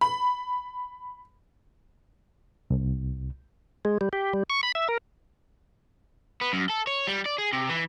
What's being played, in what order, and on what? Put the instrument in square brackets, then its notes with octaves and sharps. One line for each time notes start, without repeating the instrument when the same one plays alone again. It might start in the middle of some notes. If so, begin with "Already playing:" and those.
[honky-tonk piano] B5
[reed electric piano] C2
[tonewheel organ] G#3
G3
G4
G3
C#6
B5
E5
A#4
[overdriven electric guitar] B3
F#2
A4
C#5
G3
D5
G#4
C3
E3